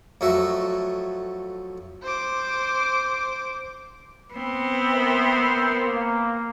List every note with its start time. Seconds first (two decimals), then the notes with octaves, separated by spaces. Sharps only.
0.21 F2 F#3 A3 F#4 E5 F#5
2.03 C5 D6
4.34 B3 C4
4.94 A#4 C5 E5
5.85 A#3